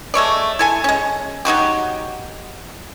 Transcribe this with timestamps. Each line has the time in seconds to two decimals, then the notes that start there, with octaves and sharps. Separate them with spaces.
0.14 G#3 A3 C#5 D5
0.59 E4 A4 G#5
0.84 G#3 C#4
1.45 F#3 D#4 F#4 G4